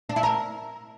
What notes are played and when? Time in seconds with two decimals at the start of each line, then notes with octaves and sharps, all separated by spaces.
0.09 D4
0.16 E4
0.23 A#4